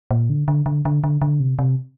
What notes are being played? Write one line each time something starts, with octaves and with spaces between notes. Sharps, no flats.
A#2
D3
D3
D3
D3
D3
D3
C3
C3